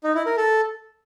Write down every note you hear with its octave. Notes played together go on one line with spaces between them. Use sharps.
D#4
E4
A#4
A4